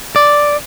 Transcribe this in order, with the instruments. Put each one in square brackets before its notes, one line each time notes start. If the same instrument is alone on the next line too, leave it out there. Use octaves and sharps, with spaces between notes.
[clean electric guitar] D5